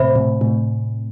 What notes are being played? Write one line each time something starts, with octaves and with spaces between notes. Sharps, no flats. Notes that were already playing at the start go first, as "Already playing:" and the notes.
Already playing: A2 C3 C5 E5 B5
A2 C3
A2 C3